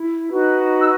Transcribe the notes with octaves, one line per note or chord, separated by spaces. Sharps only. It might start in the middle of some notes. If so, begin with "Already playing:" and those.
Already playing: E4
D#4 F#4 B4
E6